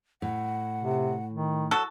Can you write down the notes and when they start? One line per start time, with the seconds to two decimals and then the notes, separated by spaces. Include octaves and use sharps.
0.22 A2 F#5
0.80 C3
1.33 D#3
1.71 F#3 F#4 A4